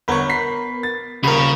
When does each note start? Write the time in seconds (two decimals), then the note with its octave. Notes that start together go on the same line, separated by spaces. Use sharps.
0.08 G1 B3 A#4 C#5 B5 C#6
0.30 B6 C7
0.83 A6
1.24 D#1 C#3 A#4 B5